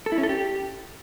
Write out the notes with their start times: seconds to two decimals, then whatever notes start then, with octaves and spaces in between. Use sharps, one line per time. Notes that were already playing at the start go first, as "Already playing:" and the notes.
0.06 A4
0.12 E4
0.18 C#4
0.23 A4
0.29 G4